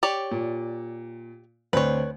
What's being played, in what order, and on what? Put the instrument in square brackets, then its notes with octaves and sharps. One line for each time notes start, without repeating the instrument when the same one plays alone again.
[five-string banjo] G4 C#5 D5
[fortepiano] A#2
[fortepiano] D2 C4 [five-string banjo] B4 C#5